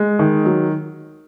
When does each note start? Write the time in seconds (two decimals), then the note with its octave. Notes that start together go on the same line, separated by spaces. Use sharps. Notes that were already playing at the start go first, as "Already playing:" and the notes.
Already playing: G#3
0.19 D#3
0.45 F#3